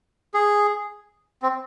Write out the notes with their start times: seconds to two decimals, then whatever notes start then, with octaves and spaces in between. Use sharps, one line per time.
0.34 G#4
1.42 C4